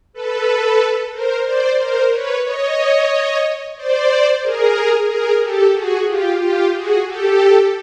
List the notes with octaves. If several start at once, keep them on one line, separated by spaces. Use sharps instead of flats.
A4 B4
A#4 C5
C5 D5
A#4 C5
B4 C#5
C#5 D#5
C5 D5
G#4 A#4
G#4 A#4
G4 A4
F#4 G#4
F4 G4
F4 G4
F#4 G#4
G4 A4